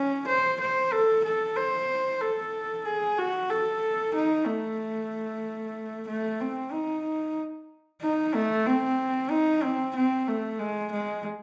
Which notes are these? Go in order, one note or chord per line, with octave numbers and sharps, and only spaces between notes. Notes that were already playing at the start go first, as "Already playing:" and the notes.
Already playing: C#4
C5
C5
A4
A4
C5
A4
G#4
F#4
A4
D#4
A3
A3
C4
D#4
D#4
A3
C4
D#4
C4
C4
A3
G#3
G#3